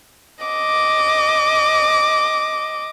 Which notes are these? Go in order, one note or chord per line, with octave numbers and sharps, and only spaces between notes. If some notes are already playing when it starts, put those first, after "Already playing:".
D#5 D6